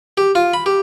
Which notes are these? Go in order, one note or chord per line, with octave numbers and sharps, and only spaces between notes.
G4
F4
B5
G4